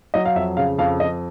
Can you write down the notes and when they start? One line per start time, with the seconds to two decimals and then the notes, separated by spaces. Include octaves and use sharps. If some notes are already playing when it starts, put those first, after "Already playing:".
0.14 F#3 D#5
0.26 F5
0.36 F2 E5
0.57 C#3 F5
0.79 F2 F5
1.00 F2 D#5